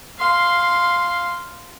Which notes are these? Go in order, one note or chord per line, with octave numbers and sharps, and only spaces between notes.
F5 C6